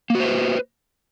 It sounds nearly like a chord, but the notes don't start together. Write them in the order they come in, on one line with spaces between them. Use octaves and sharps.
A#3 F#4 C5 B4